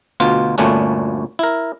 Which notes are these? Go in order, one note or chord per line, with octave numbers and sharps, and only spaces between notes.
D2 B2 F4
G1 D2 A#2 A3 C#4 D4
E4 A#4